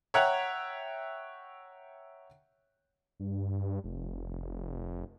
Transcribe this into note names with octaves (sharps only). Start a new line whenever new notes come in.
C#5 E5 F#5 G5 A#5 F#6
G2
F1